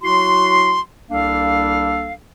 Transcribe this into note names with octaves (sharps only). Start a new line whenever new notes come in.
F#3 E4 F#4 C6
C2 G3 A#3 D4 A4 F5